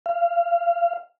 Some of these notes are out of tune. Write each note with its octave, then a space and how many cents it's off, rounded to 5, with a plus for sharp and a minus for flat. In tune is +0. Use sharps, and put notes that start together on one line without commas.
F5 -25